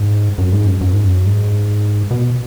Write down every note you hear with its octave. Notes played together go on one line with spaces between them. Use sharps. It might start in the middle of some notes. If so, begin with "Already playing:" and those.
Already playing: G#2
F#2
G#2
F#2
F#2
G#2
F#2
G#2
B2